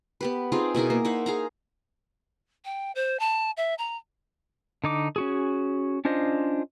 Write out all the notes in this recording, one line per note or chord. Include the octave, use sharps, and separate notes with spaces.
B3 G4 B4
C4 D#4 F4 G#4
B2 E4 G#4 A#4
A#3
D#4 C5 E5 F#5
G#4 F5 A#5
G5
C5
A5
E5
A#5
D3 D#4 D6
C#4 F#4 G#4
C#4 D4 F4 C5 D#5